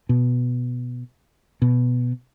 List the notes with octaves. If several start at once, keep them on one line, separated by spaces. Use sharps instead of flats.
B2
B2